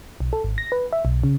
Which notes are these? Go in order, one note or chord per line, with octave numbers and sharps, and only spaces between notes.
B1
A4
G#1
A#6
B4
E5
B1
C#3